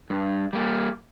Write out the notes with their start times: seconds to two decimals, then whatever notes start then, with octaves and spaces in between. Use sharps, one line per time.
0.10 G2
0.53 G3 A#3